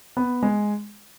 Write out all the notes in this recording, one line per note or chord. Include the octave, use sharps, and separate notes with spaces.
B3
G#3